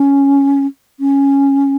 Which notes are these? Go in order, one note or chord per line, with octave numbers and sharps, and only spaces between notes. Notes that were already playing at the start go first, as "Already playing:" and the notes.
Already playing: C#4
C#4